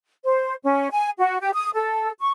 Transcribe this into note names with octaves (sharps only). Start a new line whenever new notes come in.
C5
C#4
G#5
F#4
G4
D#6
A4
C#6